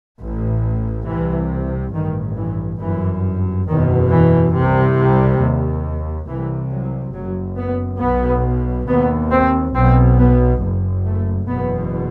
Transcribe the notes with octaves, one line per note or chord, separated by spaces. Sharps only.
A1 A2
C2 C3 E3
A1 G2 D#3
E3
G1 F#2 E3
F#1 E2 B2 D#3
E3
C2 C3
G3
D#2
C2 C3 E3
F#3
F#1 F#2 F#3
B3
B1 B2 B3
D#2 B3
C4
B1 B2 C4
B3
F#1 F#2
A3
F#1 E2 B2 B3